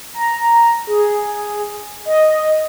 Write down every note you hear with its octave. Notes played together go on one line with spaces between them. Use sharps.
A#5
G#4
D#5